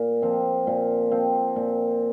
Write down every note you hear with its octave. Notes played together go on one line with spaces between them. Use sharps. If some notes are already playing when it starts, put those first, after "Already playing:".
Already playing: A#2
F3 C4
A#2
F3 C4
A#2